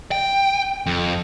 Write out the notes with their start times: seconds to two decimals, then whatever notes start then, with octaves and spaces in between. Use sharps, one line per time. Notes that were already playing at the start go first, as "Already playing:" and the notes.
0.11 G5
0.86 F2